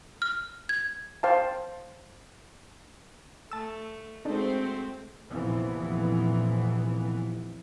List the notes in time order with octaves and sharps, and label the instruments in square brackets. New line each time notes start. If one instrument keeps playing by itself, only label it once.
[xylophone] F6
G#6
[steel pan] C5 F5 G5 A5
[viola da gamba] A3 [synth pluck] A5 E6
[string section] G#3 C4 [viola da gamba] A3 F#4 C5 [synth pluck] D4 D#4
[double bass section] F1 A#1 A#2 E3 F3 B3